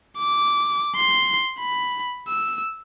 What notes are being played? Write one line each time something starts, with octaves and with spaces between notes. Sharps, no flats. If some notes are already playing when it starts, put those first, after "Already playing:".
D6
C6
B5
E6